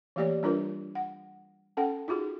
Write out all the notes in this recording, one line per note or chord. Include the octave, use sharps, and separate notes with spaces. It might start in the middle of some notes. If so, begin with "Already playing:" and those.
E3 A3 A#3 G4 C#5 D5
G3 D4 F4 A#4 B4
F#5
C#4 A4 F#5 G5
D#4 F4 F#4 G#4